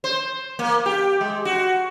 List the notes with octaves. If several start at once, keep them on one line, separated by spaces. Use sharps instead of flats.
C5
A#3
G4
G#3
F#4